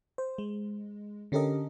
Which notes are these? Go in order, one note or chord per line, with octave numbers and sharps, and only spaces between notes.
C5
G#3
D3 C#4 G4 A4 A#4 D#5